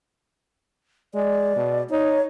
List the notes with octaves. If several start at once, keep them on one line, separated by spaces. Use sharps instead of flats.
G#3 D5
B2
D#4 C#5